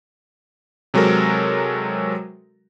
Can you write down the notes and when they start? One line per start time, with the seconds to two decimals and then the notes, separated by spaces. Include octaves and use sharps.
0.94 C3 F#3 G#3 F#4 A4 A#4